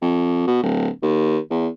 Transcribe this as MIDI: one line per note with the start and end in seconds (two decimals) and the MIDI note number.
0.02 0.45 41
0.48 0.61 47
0.63 0.88 26
1.02 1.38 39
1.51 1.68 40